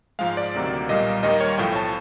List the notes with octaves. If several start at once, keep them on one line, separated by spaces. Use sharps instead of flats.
G#2 F3 G#3 F5
D5
D2 C3 D#3 F#3 A#3
B1 A#2 G3 A#3 D#5
D#2 D#3 G3 A#3 D#5
C#5
B1 A2 F3 A3 G5
A5